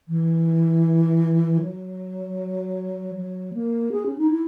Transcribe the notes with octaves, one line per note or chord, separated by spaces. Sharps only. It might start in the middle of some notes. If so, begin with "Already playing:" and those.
E3
F#3
F#3
A#3
G#4
C#4
D#4
E4